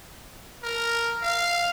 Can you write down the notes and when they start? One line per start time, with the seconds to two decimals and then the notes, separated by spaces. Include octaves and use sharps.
0.63 A#4
1.23 F5